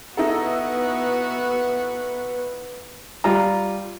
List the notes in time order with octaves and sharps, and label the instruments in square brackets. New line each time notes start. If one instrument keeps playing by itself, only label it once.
[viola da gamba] B3 F#4 [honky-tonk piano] D#4 E4 A4 [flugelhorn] B4
[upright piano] G3 F4 A#5